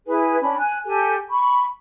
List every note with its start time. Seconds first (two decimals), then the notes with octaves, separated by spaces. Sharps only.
0.06 E4 G#4 B4 G#5
0.41 C#4 D4 B5
0.57 G#5 F#6
0.85 G4 A4 G#5
1.29 B5 C#6